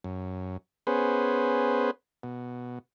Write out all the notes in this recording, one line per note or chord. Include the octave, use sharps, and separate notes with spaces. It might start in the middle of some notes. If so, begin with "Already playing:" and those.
F#2
B3 C#4 G#4 B4 C5
B2